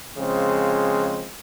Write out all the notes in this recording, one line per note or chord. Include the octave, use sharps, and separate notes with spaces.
C#3 F3 G#3 C4